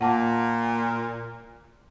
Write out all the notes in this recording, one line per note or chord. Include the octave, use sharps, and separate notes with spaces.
A#2 F#5 A5 D6